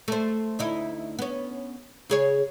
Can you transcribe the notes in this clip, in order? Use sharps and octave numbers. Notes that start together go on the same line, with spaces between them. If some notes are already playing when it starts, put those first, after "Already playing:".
A3 C5
D2 D#4 E4
B3 C#4
C#3 G#4 C#5